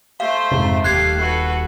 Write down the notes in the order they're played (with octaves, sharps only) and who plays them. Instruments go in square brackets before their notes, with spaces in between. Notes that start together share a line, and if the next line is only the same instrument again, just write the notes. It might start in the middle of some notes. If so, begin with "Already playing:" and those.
[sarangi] A3 [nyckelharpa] C5 C6 [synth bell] F5
[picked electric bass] F2 G#2 C3
[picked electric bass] D#1 [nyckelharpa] A3 F5 [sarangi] G4 [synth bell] F#6 G#6 C7
[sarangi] F#4 [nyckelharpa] A4 B4